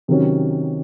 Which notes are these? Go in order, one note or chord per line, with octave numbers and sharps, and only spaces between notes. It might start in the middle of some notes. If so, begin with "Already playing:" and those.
C3 D#3 F#3 C#4